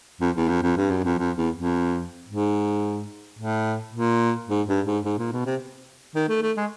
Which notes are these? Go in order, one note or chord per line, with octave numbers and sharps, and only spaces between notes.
F2
E2
F2
F2
G2
F#2
F2
F2
E2
F2
G#2
A2
A#2
G#2
G2
G#2
G#2
A#2
B2
C3
D#3
A3
A3
G#3